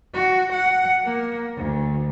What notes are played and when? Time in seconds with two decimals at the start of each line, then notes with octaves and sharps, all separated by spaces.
0.14 F#4
0.53 F#5
1.05 A#3
1.57 D2